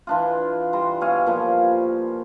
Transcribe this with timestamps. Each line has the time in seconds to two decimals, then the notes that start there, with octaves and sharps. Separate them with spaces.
0.07 E3 D4 F4
0.73 G3 A#5 C6
1.01 B2 C#5 F5 G#5
1.26 A#2 F3 G3